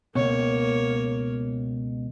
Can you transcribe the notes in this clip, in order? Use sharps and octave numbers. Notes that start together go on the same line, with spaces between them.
C#2 B2 A#3 C#5